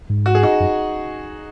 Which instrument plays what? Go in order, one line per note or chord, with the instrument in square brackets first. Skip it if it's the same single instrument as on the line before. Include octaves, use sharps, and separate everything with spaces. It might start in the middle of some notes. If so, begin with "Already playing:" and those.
[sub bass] G#2
[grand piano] F#4
G#4
D#4 F#4
[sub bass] F#2